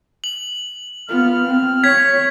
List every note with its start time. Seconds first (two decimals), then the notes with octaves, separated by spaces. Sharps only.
0.24 F#7
1.09 B3 F4 F6
1.46 C4
1.84 C#5 G#6 B6